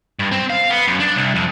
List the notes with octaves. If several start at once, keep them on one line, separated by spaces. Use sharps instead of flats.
G2
C4
F5
B3
F#2
D4
C2
F2